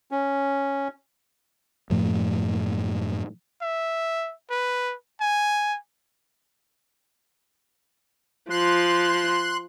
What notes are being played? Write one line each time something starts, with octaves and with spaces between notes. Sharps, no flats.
C#4
F#2 A2 F3 A3
E5
B4
G#5
F3 C6 F#6